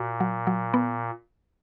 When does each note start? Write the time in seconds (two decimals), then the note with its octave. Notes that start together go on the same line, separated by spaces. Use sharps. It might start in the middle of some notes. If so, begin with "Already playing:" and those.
Already playing: A#2 F#4
0.20 F#3
0.47 F#3
0.74 B3